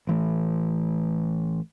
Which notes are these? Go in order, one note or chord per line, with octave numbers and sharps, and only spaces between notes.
A1 E3 A3